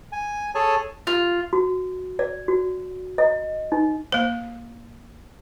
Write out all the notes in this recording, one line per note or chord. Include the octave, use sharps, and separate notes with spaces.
G#5
G#4 A4 C#5 G#5 A5
F4
F#4
D5
F#4
D#5
D#4
A#3 C5